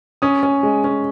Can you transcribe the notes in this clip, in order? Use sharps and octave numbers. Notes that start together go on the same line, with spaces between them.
C#4 D#6
C#4
G#3
C#4